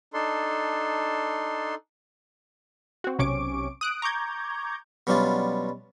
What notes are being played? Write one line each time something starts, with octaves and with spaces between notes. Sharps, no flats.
D4 D#4 A4 C6
C4 F#4
B1 C3 C#4 C#6 D6 D7
D#6 F#6 D7
A#5 C#6 D6 G6 G#6
B2 F#3 G3 C#4 D4 F4